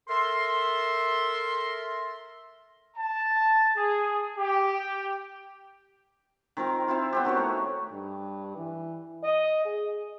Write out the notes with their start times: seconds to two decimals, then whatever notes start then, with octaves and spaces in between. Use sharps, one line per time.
0.08 A4 A#4 E5 C6
2.97 A5
3.76 G#4
4.38 G4
6.57 D#3 C4 F4 A#4
6.88 C4 E4 F4
7.13 B3 C4 G4
7.25 D#3 F#4 A#4 C#5
7.37 A3
7.93 G2
8.57 E3
9.24 D#5
9.66 G#4